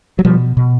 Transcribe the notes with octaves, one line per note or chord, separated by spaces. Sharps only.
F#3
B2 F3 G3
B2